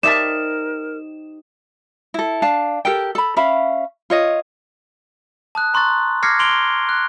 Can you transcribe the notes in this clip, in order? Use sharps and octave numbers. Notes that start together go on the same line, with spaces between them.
D#4 G4 A#4 C5 D5 E5 A5 E7
E4 A4
D4 F5 A5
G4 A4 A#4 G5
A4 B5
C#4 E5 F5 B5
F4 C#5 D#5
A5 D#6 F#6
A#5 C6 C#6 F#6 A6
D6 F6 G#6 A#6 C7 C#7
C6 D7 F7 G7
F#6